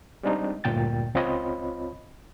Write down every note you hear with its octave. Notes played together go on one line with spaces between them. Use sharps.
G3 G#3 C4 D4 D#4
D2 G2 A#2 G5 A6
C#2 C4 F4 C#5 D#5 B5